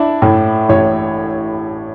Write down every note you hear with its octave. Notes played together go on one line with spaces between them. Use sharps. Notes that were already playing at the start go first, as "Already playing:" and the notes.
Already playing: D4 E4
A2
A1 C#5